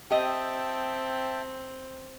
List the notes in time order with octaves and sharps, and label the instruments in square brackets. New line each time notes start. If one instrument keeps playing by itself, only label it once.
[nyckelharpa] C4 [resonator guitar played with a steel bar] G4 D#5 [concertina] E5 G5 A5